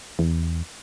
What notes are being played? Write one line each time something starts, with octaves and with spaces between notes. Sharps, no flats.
E2